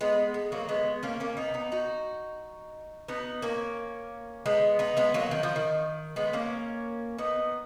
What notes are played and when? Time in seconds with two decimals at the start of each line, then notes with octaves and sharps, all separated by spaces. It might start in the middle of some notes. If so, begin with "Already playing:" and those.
0.01 G#3 B3
0.34 G#3
0.52 F#3 A#3
0.69 G#3 B3
1.03 A#3 C#4
1.20 A#3 C#4
1.37 B3 D#4
1.54 B3 D#4
1.72 D#4 F#4
3.08 B3 D#4
3.42 A#3 C#4
4.46 G#3 B3
4.79 B3 D#4
4.97 G#3 B3
5.14 F#3 A#3
5.31 D#3
5.43 F3
5.56 D#3
6.16 G#3 B3
6.33 A#3 C#4
7.19 B3 D#4